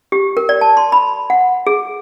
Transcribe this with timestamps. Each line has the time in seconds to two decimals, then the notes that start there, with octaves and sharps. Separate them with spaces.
0.12 G4
0.37 A#4
0.49 D5
0.61 A5
0.77 C6
0.92 B5
1.30 F#5
1.67 G#4